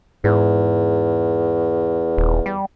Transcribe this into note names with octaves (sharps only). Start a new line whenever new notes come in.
E2 G#2
D#1
G3